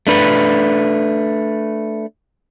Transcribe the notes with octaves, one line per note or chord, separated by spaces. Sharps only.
A3 D4 B4